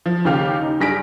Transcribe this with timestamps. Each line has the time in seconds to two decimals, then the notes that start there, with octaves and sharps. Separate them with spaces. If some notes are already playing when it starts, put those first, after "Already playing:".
0.06 F3
0.25 D#2 C#3 G4 F5 F7
0.61 D#4
0.80 G2 G#4 A#6 B6 D7